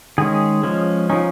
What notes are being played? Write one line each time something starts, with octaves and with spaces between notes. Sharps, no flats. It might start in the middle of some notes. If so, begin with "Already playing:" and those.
D#3 G#3 C#4 G#4
F3 G#3 C#4
F3 C#4 D#4